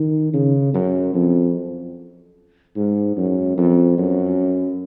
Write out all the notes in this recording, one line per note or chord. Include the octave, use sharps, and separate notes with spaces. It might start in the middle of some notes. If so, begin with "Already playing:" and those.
Already playing: D#3
C#3
F#2
F2
G#2
F#2
F2
F#2